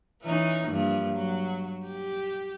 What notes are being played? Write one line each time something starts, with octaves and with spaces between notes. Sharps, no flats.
E3 C#4 D#4
G2 F3 A#3
F#3
G4